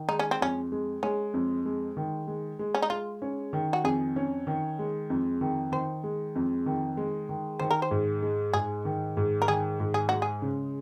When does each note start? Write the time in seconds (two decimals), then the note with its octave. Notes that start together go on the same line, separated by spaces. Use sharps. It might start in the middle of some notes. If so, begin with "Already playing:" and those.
Already playing: D#3
0.08 G#3 D#4
0.19 C#4
0.31 C4
0.41 F2 C#4
0.72 G#3
1.03 G#3 C#4
1.34 F2
1.66 G#3
1.97 D#3
2.27 G#3
2.59 G#3
2.75 C#4
2.82 D#4
2.90 G#3 F4
3.22 C#4
3.53 D#3
3.73 F#4
3.84 F2 G#4
4.16 C#4
4.47 D#3
4.79 G#3
5.10 F2
5.41 D#3
5.72 D#3 C5
6.04 G#3
6.35 F2
6.66 D#3
6.97 G#3
7.29 D#3
7.59 D#3 C5
7.71 A#4
7.82 C5
7.91 G#2
8.22 G#3
8.53 G#2 G#4
8.85 D#3
9.17 G#2
9.42 A#4
9.48 D#3 G#4
9.80 G#2
9.94 G#4
10.09 G#3 F#4
10.22 G#4
10.42 C#3